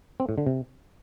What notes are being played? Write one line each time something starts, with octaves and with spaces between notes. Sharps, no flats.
C4
A2
D3
C3